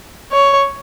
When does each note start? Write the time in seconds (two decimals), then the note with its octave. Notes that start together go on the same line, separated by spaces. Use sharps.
0.32 C#5